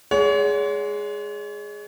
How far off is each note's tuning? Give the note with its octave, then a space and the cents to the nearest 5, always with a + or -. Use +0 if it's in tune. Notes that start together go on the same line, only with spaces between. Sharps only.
G#3 +0 C#5 +35 F#5 +0